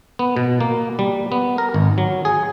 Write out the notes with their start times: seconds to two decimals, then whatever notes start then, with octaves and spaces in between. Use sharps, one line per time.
0.19 B3
0.37 B2
0.61 A#3
0.99 G3
1.32 B3
1.58 A#4
1.74 G#1
1.98 F#3
2.25 G#4